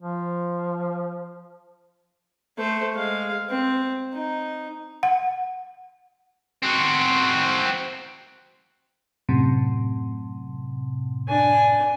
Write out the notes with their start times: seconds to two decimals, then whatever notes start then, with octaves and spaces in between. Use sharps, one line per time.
0.01 F3
2.58 A3 C5
2.95 G#3 F5
3.50 C4
4.13 D#4
5.03 F#5
6.62 C4 F#4
9.29 F#2 A2 C3
11.29 D4 G#5